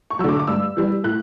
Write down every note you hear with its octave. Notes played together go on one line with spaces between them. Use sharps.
C#6
D3 F#3 D6 E6
D6
G2 E6
E3 G3
A2 F#6